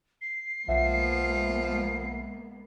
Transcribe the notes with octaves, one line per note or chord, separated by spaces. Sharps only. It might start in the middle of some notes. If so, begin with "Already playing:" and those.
C7
B1 F3 G#3 A#3 B3 E5 F#5